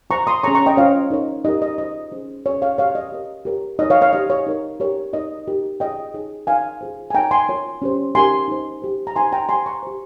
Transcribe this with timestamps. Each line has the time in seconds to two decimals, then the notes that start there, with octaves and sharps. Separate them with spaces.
0.10 F4 C5 A#5 C#6
0.27 C6 D#6
0.43 C#4 G#4 C#5 A#5 C#6
0.55 A#5 C#6
0.66 D#5 G5
0.77 C#4 F4 C5 C#5 F5
1.11 D#4 A#4 C#5
1.45 D#4 G4 A#4 D#5
1.62 D#5
1.78 F4 C5 D#5
2.12 C#4 G#4 C5
2.46 C#4 G#4 C#5
2.62 C#5 F5
2.78 G4 A#4 C#5 F5
2.95 D#5
3.12 G4 A#4 C#5
3.45 G4 A#4 C#5
3.79 D#4 A#4 C#5 D#5
3.90 C#5 F5
4.02 C#5 F5
4.13 D#4 G4 C5 D#5
4.30 C#5
4.47 D#4 A#4 C#5
4.80 G4 A#4 C#5
5.13 D#4 A#4 C#5 D#5
5.47 D#4 G4 A#4
5.80 F4 G#4 C#5 D#5 G5
6.14 D#4 G#4 C#5
6.47 D#4 A#4 C#5 F5 G#5
6.81 F4 G#4 C5
7.10 G#5
7.14 D#4 A#4 C#5 G5 A#5
7.31 G#5 C6
7.49 F4 A#4 C#5
7.82 C#4 G4 C5
8.15 D#4 G4 A#4 G#5 C6
8.48 D#4 G4 C5
8.82 G4 C5
9.07 A#5
9.16 D#4 G4 C5 G#5 C6
9.32 G5 A#5
9.49 G4 G#5 C6
9.53 C5
9.66 A#5 C#6
9.83 G4 C5